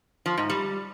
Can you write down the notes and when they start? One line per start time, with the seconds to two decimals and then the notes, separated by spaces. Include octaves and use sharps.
0.26 F3
0.38 G#2
0.50 G3